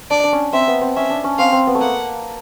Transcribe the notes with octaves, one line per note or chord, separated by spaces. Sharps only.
D4 D5
D4
C#4
C4 E5
B3
C4
C#4 E5
D4
C#4
C4 F5
C4
B3
A3
A#3 F#5